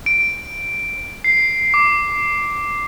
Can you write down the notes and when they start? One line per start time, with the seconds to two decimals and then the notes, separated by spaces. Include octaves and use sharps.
0.06 D7
1.24 C7
1.74 D6